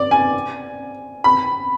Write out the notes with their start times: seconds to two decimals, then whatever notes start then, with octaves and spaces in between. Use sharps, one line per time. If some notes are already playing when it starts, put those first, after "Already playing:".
Already playing: D5
0.11 G#5
1.24 B5